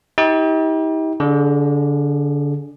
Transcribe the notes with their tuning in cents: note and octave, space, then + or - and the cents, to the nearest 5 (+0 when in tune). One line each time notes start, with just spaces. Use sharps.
D#4 +45 G4 +0
D3 -25 G#4 +0 D5 +35